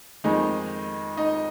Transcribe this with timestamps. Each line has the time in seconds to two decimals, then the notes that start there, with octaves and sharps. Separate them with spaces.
0.24 F2 D#3 G#3 D#4 D#5
1.17 D#4 D#5